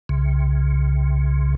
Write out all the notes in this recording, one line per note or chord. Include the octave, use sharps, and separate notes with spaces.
C2 C#3